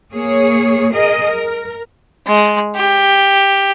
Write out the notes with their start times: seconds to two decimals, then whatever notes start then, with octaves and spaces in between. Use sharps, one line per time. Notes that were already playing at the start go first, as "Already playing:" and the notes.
0.12 A#3 G#4 C#5
0.92 G#4 A#4 D#5
1.25 A#4
2.27 G#3
2.77 G4